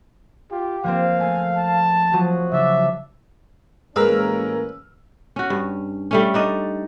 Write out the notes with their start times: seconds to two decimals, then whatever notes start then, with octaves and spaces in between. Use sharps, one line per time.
0.51 F4 G4
0.84 F3 A#3 C4 F5
1.20 A3 G#5
1.55 A5
2.13 F3 F#3 F#4 D#6
2.52 C#3 D4 E5
3.96 A1 G#3 A#3 C#4 A#4 B4 E6 F6
5.36 C#4 F#4
5.50 G2
6.11 G3 A3 C#4
6.34 D4 D#4 D#5